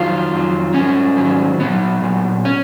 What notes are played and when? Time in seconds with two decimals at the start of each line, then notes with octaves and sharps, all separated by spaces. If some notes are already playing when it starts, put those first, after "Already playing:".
Already playing: F2 D#3 F#3 F4
0.32 F2 D#3 F#3
0.74 G#2 D#3 F#3 C#4
1.17 G#2 D#3 F#3
1.59 A#2 F#3 B3
2.02 A#2 F#3
2.45 C#4